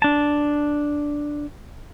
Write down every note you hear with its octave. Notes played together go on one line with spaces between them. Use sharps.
D4 A5